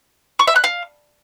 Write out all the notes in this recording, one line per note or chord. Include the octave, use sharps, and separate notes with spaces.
C#6
E5
F#6
F5